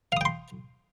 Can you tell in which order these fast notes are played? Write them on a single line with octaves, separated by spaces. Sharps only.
F5 D#6 G5 C6